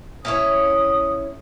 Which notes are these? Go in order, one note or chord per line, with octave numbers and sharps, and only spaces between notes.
C#4 E4 C#5 D#6